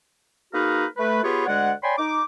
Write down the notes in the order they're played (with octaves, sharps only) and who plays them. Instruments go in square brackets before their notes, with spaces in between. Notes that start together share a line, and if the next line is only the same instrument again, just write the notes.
[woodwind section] A#3 D#4 F#4 G#4 A#4 B4
A3 B4
B3 F4 G4 G#4 B4 C#5
D2 G#3 D5 F#5
C#5 D5 G5 G#5 B5 C6
D#4 D6